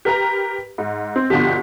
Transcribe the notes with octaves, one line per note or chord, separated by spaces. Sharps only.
G4 A#4 B4 A#5
G#2
C4
G1 B2 D3 F3 G4